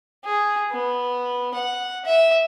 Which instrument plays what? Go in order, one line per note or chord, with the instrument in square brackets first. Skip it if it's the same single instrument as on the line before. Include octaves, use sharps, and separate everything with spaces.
[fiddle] G#4
B3
F#5
E5